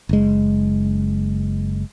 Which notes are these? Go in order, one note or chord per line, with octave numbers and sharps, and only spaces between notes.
F#1 G#3